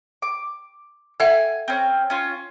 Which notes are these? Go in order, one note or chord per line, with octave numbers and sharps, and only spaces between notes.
D6
A4 E5 F#5 G#5
C4 C#4
C#4 F4